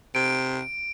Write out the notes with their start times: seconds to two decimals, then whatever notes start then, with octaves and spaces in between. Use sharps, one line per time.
0.15 C3 D7